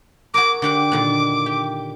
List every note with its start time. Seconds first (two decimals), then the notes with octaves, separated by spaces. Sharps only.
0.34 F#4 G#4 A#4 D6
0.62 D3 G4 F#5 D6
0.92 A#2 D3 D#3
1.46 G4